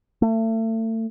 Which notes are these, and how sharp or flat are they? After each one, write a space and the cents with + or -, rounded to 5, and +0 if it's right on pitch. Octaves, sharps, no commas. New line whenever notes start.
A3 +35